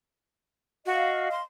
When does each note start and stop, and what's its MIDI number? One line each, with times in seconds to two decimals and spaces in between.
0.86 1.31 66
0.86 1.40 75
0.86 1.40 77
1.31 1.42 84